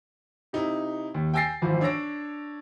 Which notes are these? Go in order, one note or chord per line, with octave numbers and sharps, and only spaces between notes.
C3 D#4 E4
D#2
G5 G#5 E6 A6 A#6 C7
G#1 E3 F3
D4 C#5 E6 A#6 D7